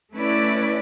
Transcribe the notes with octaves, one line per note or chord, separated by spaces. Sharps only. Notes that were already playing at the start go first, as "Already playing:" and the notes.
A3 C#4 E4 B4 D5